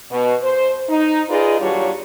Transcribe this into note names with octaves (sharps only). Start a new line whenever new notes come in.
B2
C5
D#4
D#4 F4 G#4 B4 D5 D#5
D#2 F#3 G3 D4 F4 C#5